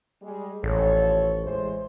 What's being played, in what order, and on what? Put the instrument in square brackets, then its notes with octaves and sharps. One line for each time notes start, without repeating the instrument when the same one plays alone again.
[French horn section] G3 G#3
[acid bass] A1 [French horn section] F3 A4 C#5
[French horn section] E3 G#3 C5